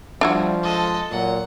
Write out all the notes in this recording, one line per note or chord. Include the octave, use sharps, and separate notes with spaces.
F3 G3 D4 E4 F#4
G#3 A4 D#5
A#2 F#3 F#5